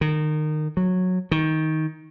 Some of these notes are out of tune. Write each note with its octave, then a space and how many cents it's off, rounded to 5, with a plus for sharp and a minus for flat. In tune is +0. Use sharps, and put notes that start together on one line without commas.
D#3 -25
F#3 -15
D#3 +15